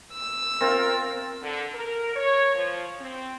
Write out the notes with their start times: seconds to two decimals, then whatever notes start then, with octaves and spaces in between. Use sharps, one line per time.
0.12 E6
0.61 C4 F4 A#4
1.41 D3
1.74 A#4
2.16 C#5
2.55 F3
3.00 C4